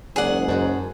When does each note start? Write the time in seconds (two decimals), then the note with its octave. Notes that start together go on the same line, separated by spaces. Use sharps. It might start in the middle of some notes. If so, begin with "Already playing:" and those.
0.16 F#1 G#2 F#3 G#4 D5 F#5 G#5
0.48 F#2 F#3 B3 A5